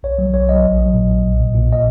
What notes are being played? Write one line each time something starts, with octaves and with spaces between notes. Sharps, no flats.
B1 C#5
F#3
B1 C#5
F#3 D#5
A#1
F#3
A#2
A#1
B1
A#2
A#2
D#5